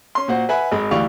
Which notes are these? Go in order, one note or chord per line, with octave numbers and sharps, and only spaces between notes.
C#4 C6
A#2 F#4 C5 F#5
B4 E5 F#5 G#5 B5
G#1 G#3 B5
D2 E3 G4 D5 F5 C#6